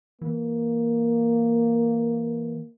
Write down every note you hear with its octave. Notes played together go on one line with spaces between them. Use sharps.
E3 A#3